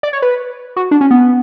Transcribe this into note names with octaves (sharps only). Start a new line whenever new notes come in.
D5
C#5
B4
F#4
D4
C#4
B3